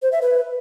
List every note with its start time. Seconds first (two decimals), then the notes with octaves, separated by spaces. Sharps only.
0.02 C5
0.12 E5
0.22 B4